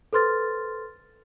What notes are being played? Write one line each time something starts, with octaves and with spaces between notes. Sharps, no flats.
A4 B4 C5 C6 F6 A6